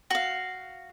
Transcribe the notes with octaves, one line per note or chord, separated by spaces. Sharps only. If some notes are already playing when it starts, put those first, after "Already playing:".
F#4 F5